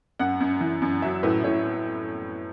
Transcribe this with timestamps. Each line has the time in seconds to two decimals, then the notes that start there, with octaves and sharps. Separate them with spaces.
0.19 F#2 F#5
0.40 F#2
0.61 E3
0.82 F#2
1.02 F#3 E5
1.23 A2 B4
1.44 A2 C#5